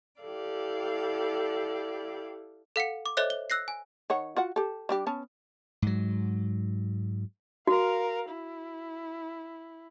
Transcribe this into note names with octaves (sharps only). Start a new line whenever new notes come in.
E4 G4 A4 D5 F5
A4 F5 F#5 C#7
D6
A4 C5 C#5 D#5 E5 F#6
G7
E6 F#6 A#6 C7
G#5
D#3 C#5 F#5
F4 F#4 F#5
G4 A4
G3 D4 G4
B3 C#4 A5
G#2 F#3
F#4 A#4 F5
E4